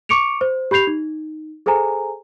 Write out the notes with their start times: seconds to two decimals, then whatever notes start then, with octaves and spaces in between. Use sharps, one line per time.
0.09 C#6 D6 C#7 D7 F7
0.41 C5
0.71 G4 B5 G6 C7 F7
0.87 D#4
1.66 G#4 A4 C5 G#5 A#5